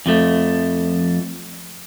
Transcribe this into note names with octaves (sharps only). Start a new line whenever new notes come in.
F2 F3 A3